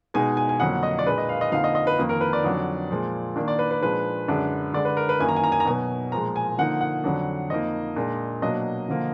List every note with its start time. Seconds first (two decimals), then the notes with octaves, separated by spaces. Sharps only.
0.14 B2 G#3 D#4 G#5
0.37 G#5
0.49 G#5
0.60 F2 D3 F#3 A#3 F#5
0.83 D#5
0.99 D5
1.06 A#2 G#3 D4 B4
1.18 D#5
1.29 F5
1.41 D#5
1.52 F2 D3 F3 A#3 D#4 F5
1.64 D#5
1.75 D#5
1.87 B4
1.98 F2 D#3 A#3
2.09 A#4
2.21 B4
2.33 D5
2.44 F2 D3 F#3 D4
2.91 A#2 F3 G#3
3.36 D#3 A#3 D4
3.48 D5
3.59 B4
3.71 B4
3.82 A#2 F3 G#3 D4 B4
4.28 F#2 D3 G#3 D4
4.74 D3 G#3 D4 D5
4.85 B4
4.97 A#4
5.09 B4
5.20 F#2 D#3 A#3 G#5
5.28 A#5
5.36 G#5
5.44 A#5
5.52 G#5
5.60 A#5
5.66 B2 F#3 B3 G#5
6.12 A#2 F3 G#3 A#5
6.36 G#5
6.58 D3 F3 A#3 D#4 F#5
6.81 F#5
7.04 F2 D3 F#3 D4
7.50 F2 F3 A#3 D#4 D#5
7.96 A#2 G#3 D4
8.42 B2 F#3 A#3 D4 D#5
8.88 D3 F3 A#3